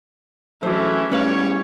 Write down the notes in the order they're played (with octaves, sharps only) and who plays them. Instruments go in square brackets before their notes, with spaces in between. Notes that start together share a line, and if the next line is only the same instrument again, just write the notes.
[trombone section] A#1 A3 [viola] E3 C#4 [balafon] F#3 F#4 [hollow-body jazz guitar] C5
[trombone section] E2 G#2 [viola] G3 C#5 [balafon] A3 [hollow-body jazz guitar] C#4 B4 F5